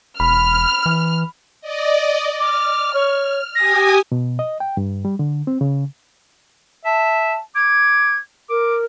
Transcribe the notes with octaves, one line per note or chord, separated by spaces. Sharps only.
E1 B5 F6
E3
D5 D#5
D6 F6
C#5
G4 G#5 D#6 A#6
B2
D#5
G5
G2
G3
D3
C4
C#3
E5 A5
D6 G#6
A#4 D6